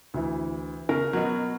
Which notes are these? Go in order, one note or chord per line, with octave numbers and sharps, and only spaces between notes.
D2 E3
C#3 A#4
B2 F#3